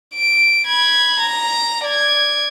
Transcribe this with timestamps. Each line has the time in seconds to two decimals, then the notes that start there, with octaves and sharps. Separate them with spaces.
0.14 D7
0.67 B5 G#6
1.19 A#5
1.84 D5 G#6